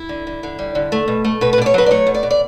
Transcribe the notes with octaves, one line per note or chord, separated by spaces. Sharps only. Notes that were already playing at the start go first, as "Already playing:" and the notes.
Already playing: E4
D3
D3
D3
G3
D3
A3
B2
A3
B2 B4
B4
B2 D5
C#5
F#3 B4
D5
A3 C#5
B2
D5
B2
D5